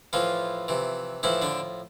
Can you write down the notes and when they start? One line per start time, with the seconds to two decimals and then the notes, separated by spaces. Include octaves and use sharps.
0.13 A2 E3 F3 F4
0.68 C3 E3
1.23 A2 E3 F3 E4
1.42 D3 D4